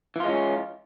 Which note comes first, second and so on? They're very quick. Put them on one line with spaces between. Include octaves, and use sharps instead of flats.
E3 F4 G#3 C#4